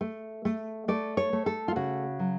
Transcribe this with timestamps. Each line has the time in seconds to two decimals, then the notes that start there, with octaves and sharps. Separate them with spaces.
0.01 A3
0.45 A3
0.88 A3 D5
1.17 C#5
1.33 A3
1.46 A4
1.68 F4
1.76 C#3 F#4
2.19 F#3